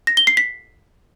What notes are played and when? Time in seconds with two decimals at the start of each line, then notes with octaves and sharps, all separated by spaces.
0.07 A#6
0.17 G7
0.27 C7
0.37 B6